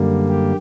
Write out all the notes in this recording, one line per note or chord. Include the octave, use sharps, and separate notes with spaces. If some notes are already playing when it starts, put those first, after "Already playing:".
Already playing: F#2 D3 G3 A#3
G4